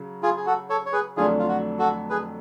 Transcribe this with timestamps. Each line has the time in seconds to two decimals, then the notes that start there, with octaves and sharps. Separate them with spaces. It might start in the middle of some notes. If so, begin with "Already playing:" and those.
Already playing: C#3 F#3
0.23 F4 G#4
0.37 G#4
0.46 F#4 A4
0.70 A4 C#5
0.86 C#5
0.93 G#4 B4
1.17 F2 D3 F#3 A3 D4 F4 G#4
1.39 F4
1.48 F#4
1.79 F#4 A4
2.10 G#4 B4